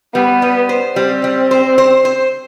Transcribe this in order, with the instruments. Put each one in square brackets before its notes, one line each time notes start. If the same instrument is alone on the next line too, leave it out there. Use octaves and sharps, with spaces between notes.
[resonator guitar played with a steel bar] G3 [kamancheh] B3
[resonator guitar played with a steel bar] G3
C5
[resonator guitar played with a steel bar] G3 [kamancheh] C4
[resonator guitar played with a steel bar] G3
C5
C5
C5